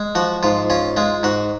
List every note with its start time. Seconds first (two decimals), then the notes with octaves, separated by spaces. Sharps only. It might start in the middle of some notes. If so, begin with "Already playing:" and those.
Already playing: G#3
0.15 F3 F#4
0.43 G#2 F4
0.70 C#4 F4
0.97 G#3 F4
1.23 G#2 F#4